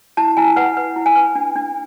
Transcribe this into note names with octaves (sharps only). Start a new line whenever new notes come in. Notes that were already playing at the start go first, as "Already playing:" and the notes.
E4 A5
E4 G#5
B4 F#5
B4
E4
G#5
B4
D4
D4